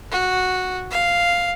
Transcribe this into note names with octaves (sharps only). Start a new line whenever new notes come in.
F#4
F5